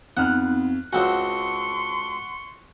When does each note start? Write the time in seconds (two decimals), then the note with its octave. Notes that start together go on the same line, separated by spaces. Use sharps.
0.17 F2 B3 C4 D#4 F#5 F6 F#6
0.93 C#2 C4 F#4 F#5 A5 C6 C#6